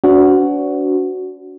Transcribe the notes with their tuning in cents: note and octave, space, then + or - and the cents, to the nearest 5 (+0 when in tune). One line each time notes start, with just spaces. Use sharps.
D4 -40 F#4 +0 B4 +45